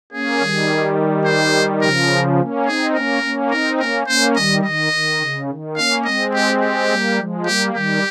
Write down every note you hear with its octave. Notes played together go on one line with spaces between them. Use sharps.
A#3 C#4 G#4
D#3 G3
C5
C#3 F3 A#4
A#3 C#4
C4 D#4 G#4
A#3 C#4 A#4
A#3 C#4
C4 D#4 A#4
A#3 C#4 A#4
A#3 C#4 C5
D#3 G3 D#5
D#3 D#5
D#3
C#3
D#3
A#3 C#4 F5
G#3 C4 D#5
G4
G4
G3 A#3
F3 G#3
G3 A#3 G4
D#3 G3 G4